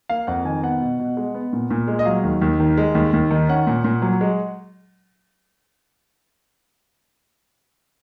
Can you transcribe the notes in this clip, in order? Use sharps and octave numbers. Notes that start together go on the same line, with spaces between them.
A#3 F5
F2 F#5
D#3 G#5
B3 F#5
B2
B2
G#3
B3
A#2
A#2
G#3
D#5
F#3 F5
D#2
D#2
D#3
G#3
D#2
D#2
D#3
C#4 F#5
A#2
A#2
F#3
G#3